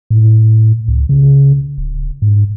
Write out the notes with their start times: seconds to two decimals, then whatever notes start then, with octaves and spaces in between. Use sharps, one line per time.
0.10 A2
0.88 C#2
1.09 C#3
1.78 D1
2.22 G#2